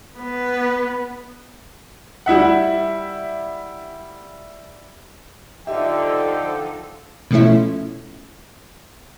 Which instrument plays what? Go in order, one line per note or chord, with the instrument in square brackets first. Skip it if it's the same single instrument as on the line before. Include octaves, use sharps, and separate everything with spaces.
[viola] B3 B4
[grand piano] G3 E4 E5 F#5
[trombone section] D3 [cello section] F3 D#4 A4 [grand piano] G4 E5 [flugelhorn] G5
[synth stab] B2 F3 A3 C#4 E4